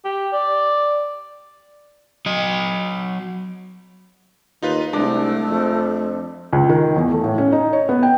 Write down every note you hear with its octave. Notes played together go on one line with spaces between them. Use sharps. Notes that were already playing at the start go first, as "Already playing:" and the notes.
G4
D5
F#3 D#5
D#2 D#4 F4 B4
C2 G#3 A3 D4
F2
C#2
D#3
E2
A3
A2
C#4
D#4
C#5
B3
G5